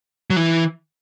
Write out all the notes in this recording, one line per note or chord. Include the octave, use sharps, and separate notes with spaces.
F#3
E3